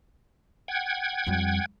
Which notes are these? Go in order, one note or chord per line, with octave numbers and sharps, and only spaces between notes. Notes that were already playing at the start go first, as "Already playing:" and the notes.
F#5 G5 G#6
F2 G3